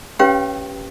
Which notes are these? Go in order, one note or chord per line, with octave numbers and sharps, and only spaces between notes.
C#4 G4 B4 C#5 F5 G5